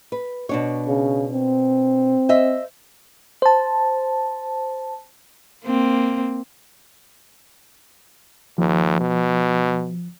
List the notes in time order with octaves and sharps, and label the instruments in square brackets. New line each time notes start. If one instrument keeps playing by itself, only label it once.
[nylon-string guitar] B4
B2 D4 C#5
[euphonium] C#3
C4
[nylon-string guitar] C5 D#5 E5
[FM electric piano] C5 A5
[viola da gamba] A#3 C4
[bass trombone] D#2 [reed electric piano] F3
[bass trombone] B2